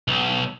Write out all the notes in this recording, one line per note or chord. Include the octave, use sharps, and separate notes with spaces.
B1